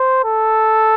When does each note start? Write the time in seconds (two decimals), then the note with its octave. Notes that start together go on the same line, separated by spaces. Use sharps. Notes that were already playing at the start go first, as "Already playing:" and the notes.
Already playing: C5
0.25 A4